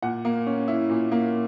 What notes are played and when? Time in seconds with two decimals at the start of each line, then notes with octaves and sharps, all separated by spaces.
0.02 A#2 F#5
0.25 A#3
0.47 C#4
0.68 E4
0.90 A#2
1.12 A#3